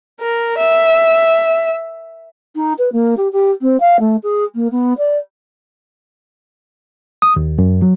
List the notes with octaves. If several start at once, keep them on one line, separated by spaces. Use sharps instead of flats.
A#4
E5
D#4
B4
A#3
G4
G4
C4
F5
A3
G#4
A#3
B3
D5
D#6
D#2
F#2
F#3